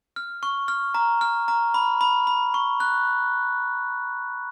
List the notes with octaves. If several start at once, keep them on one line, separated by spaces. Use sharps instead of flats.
F6
C#6
F6
A#5
F6
A#5
B5
B5
B5
C#6
F#6